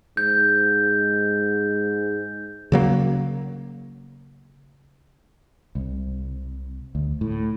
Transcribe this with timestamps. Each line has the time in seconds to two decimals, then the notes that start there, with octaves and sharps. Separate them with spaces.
0.17 G#2 G6
2.72 C#3 F#3 A#3
5.75 C2
6.95 D2
7.21 A2